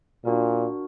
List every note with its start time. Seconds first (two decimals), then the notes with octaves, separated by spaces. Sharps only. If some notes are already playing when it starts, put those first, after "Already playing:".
0.25 A#2 D4 F#4 A#4